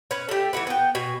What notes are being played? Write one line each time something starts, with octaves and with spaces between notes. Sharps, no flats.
C#4 B4
A3 G4
E3 A3 F#4 B4
B3 G5
B2 G#5